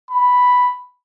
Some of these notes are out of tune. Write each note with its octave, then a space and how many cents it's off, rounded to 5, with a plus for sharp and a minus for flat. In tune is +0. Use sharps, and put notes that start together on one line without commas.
B5 +0